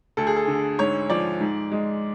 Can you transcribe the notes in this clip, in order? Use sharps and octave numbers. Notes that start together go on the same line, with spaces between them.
D2 A4
G#4
A4
D3
G#2 C#5
F3 D5
G#2
G#3